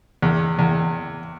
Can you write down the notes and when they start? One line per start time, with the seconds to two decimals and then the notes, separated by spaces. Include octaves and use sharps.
0.22 E2
0.59 E2